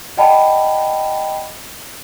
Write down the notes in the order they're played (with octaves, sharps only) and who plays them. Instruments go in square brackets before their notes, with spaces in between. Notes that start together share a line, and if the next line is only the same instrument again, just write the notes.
[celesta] D5 D#5 F#5 G5 A5 B5